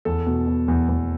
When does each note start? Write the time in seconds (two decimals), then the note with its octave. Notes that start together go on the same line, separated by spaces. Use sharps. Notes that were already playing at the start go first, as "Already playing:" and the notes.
0.05 E2 A4
0.27 B2
0.47 B2
0.68 E2
0.89 E2